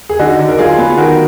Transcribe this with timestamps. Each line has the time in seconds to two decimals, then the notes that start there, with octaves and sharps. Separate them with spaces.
0.09 G#4
0.19 D3 D#4 F#4
0.39 D3
0.49 A#4
0.58 F#3 F4 G#4
0.78 B3
0.98 D#3 F#4 A#4